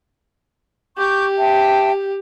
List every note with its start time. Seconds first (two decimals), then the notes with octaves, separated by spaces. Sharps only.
0.98 G4 C#6 D6 G6
1.38 E5 G5 A5